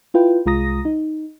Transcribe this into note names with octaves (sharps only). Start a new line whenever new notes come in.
E4 F4 B4 G5
C2 G#3 F4 A#5 D#6 A#6
D#4